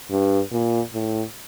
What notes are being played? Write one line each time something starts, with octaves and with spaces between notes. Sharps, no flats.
G2
A#2
A2